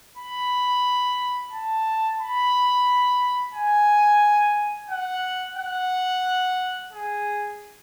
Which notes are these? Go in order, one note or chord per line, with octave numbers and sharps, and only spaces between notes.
B5
A5
B5
G#5
F#5
F#5
G#4